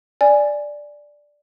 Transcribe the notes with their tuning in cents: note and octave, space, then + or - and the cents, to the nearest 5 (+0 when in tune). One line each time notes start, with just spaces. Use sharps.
D5 +0 G#5 +0